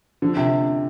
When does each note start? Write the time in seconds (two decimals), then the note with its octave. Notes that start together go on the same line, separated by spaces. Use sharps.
0.22 D3 F3
0.37 C3